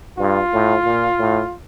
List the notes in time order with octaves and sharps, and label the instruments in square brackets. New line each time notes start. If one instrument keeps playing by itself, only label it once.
[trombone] G2 [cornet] F4
[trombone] A2
A#2
A2